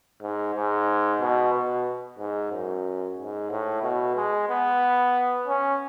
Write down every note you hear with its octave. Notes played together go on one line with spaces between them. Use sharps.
G#2
G#2
B2
B2
G#2
F#2
G#2
A2
B2
G#3
B3
C#4